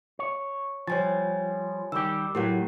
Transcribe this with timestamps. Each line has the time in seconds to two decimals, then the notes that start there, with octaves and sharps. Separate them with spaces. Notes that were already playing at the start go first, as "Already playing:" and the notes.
0.19 C#5
0.87 F3 G3 C#5 G#5 A6
1.92 D#3 G3 G4 D6 E6
2.35 A2 F#3 G4 A#4 F#5